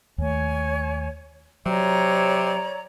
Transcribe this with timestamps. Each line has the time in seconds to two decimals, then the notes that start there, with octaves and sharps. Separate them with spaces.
0.18 D#2 A3 C#5 G#5
1.66 C3 F#3 C#5 D5 A#5